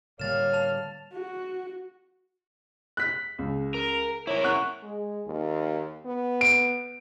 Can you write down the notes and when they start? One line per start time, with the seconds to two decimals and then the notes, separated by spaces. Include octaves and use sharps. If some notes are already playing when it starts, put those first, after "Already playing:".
0.20 A2 D3 G3 A#3 C#5 F6 A6 E7
0.53 A5 F7
1.12 F#4
2.97 F#6 B6
3.39 C#2
3.74 A#4
4.27 E4 A#4 C#5
4.44 F#5 C#6 F#6
4.83 G#3
5.27 D#2
6.05 B3
6.41 D7